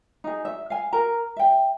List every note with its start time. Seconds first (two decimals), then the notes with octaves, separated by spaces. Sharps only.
0.24 D#4 G#4
0.45 E5
0.70 F5 G#5
0.93 A#4 A#5
1.36 E5 G5